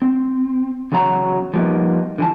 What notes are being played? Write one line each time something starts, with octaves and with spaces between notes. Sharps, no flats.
C4
E2 C#3 F#3 F#4 A#5
F3 G3 A#3 B3 D#4
D3 E3 A5